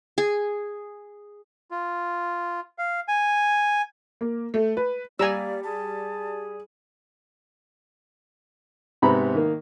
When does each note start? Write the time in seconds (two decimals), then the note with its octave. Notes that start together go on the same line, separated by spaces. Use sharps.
0.18 G#4
1.71 F4
2.78 F5
3.08 G#5
4.21 A#3
4.54 A3
4.77 B4
5.19 G3 A#3 D5 G#5 A#5 E6
5.64 G#4 A5
9.02 G#2 C3 B3 A#5 B5
9.35 D#3 A#3